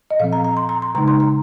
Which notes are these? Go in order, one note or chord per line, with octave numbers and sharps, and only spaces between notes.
D#5
A#2 F3 C4 F5
A#5
A#5
C6
A#5
C6
C#3 G#3 D#4 A#5
C6
A#5